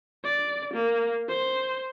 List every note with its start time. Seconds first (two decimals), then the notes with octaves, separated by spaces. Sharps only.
0.24 D5
0.74 A#3
1.29 C5